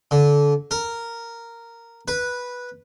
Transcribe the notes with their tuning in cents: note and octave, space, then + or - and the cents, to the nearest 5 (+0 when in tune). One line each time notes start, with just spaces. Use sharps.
D3 -25
A#4 -10
B4 -10